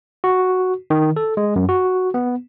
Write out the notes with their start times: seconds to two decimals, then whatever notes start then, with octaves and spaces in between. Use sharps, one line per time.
0.24 F#4
0.90 D#3
1.16 A4
1.37 G#3
1.56 F#2
1.69 F#4
2.14 B3